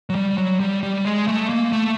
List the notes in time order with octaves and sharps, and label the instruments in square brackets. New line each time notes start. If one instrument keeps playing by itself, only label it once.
[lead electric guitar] F#3
G3
F#3
G3
G3
G#3
A3
A#3
A3